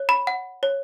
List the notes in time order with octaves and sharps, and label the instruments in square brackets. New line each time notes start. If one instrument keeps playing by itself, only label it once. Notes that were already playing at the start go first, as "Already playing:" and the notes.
Already playing: [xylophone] C#5
B5
F#5
C#5